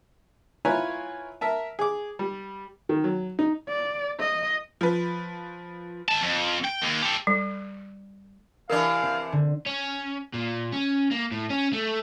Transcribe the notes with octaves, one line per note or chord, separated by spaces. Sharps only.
E4 F4 B4 C#5 G#5 A#5
A#4 E5 A5
G#4 D6
G3
D#3
F#3
D#4
D5
D#5
F3 B4
D#3 A5
F2
G5
D#2
G4 A4
G3
C3 E3 D4 A#4 F5
C4
D3
C#4
A#2
C#4
A#3
A2
C#4
A3